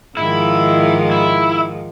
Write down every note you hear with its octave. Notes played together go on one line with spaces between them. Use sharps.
G#2 D#3 F3 E4
E4